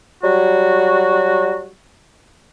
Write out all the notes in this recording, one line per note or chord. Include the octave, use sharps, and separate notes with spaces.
F#3 G3 F#4